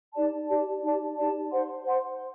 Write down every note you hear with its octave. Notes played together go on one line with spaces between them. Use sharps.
D#4 G4 D5 A5
D#4 G4 D5 A5
D#4 G4 D5 A5
D#4 G4 D5 A5
C5 F#5 C6
C5 F#5 C6